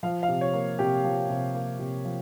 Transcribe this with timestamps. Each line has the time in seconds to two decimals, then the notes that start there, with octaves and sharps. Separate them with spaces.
0.03 F3 F5
0.23 F5
0.29 C3
0.41 C#5
0.54 A#3
0.79 C3 G4
1.04 F3
1.30 C3
1.54 A#3
1.79 C3
2.05 F3